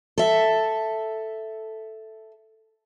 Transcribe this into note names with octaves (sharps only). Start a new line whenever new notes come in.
A4 E5